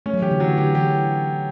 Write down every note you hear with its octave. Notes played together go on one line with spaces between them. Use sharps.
A3 C#4
F#3
E3 G4
D3
E3 F#3
D3 G4
E3 G4